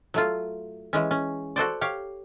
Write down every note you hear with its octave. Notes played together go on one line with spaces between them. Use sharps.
F#3 A3 F4
E3 G#3 C#4
C#4
F#4 A4 C5 D5
G4 C#5 F5